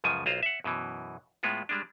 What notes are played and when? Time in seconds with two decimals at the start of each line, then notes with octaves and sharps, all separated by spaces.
0.04 C#2 F#2 C#3 F3 G#5
0.26 B1 F4 C5 A#5
0.43 E5 F#5
0.64 F#2 B2 E3
1.43 A2 G#3 B3 F4
1.69 G3 G#3 D4